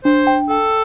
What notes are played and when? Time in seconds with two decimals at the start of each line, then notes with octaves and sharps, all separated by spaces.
0.04 D4 C5
0.27 G5
0.50 A4 G5